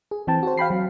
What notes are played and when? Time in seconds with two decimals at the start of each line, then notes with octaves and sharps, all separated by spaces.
0.11 G#4
0.27 E3 C4 G5 A5
0.43 F#4 C5
0.58 F5 G5 B5 C7
0.70 F#3